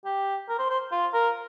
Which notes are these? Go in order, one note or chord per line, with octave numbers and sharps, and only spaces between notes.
G4
A#4
C5
C5
F4
A#4